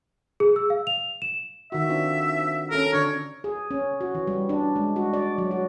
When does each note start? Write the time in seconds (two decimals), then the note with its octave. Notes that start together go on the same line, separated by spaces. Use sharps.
0.40 G#4
0.56 E6
0.70 F5
0.87 F7
1.22 E7
1.72 D#3 F#4 E5
1.90 C4 D4 F4
2.71 C#4 A4 A#4
2.93 D3 D4 C#5
3.44 G#4
3.71 C#4
4.01 F#4
4.15 E3
4.27 G3
4.49 D4
4.76 G#3
4.96 F#4
5.13 D5
5.38 F#3
5.51 F#4